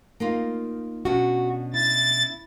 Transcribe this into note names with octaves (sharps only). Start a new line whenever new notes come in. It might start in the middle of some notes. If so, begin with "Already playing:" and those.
A#3 D#4 F4
B2 C#4 D4 F#4
E4 A6